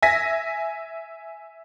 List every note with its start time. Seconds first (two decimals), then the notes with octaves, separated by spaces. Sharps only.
0.02 E5 G#5 A#6 B6